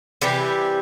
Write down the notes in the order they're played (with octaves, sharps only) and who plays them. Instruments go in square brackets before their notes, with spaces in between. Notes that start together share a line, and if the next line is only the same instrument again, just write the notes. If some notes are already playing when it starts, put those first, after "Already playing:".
[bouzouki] C3 E3 G3 G4